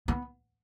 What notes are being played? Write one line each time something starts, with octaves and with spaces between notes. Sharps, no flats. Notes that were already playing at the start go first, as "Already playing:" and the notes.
B3